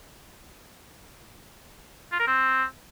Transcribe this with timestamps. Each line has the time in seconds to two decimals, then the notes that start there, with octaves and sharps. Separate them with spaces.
2.12 F4
2.19 A#4
2.27 C4